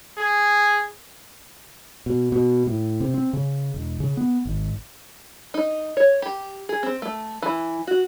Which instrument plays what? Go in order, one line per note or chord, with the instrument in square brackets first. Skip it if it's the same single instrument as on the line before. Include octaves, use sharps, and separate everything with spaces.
[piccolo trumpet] G#4
[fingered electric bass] B2
B2
A2
C3
C4
C#3
E1
C#3
B3
G#1
[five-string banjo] D#4
C#5
G4
G#4
C4
A3
E3
F#4